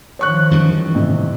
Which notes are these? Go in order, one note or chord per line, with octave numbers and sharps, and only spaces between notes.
D#3 F3 C#5 C#6 F#6
F#2 E3 G3
A1 C3